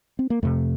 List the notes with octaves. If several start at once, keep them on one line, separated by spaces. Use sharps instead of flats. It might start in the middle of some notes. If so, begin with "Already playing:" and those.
C4
A#3
F2 C3 A3